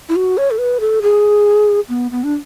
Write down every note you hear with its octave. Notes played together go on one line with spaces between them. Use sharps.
E4
F#4
C#5
A4
B4
A4
G#4
B3
B3
D4